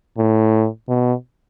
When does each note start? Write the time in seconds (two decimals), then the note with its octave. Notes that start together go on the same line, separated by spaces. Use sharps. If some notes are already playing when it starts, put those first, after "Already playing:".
0.18 A2
0.88 B2